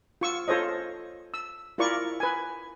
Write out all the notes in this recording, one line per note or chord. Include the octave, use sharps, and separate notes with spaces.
F4 C#6 E6
F4 A4 C5 C#5 D#5
E6
E4 F4 A#4 D5 C#6
B4 G#5